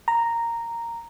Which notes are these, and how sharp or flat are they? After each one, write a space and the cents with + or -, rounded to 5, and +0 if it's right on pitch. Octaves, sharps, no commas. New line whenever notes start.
A#5 -5